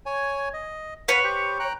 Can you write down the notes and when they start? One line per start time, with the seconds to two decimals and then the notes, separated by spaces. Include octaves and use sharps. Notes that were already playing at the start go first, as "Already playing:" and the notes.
0.06 C#5 G#5
0.53 D#5
1.08 B4 C#5 F5 F#5
1.24 G4 C5
1.60 G5 A#5 F#6